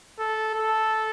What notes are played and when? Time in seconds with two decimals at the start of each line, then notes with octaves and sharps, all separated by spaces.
0.19 A4
0.55 A4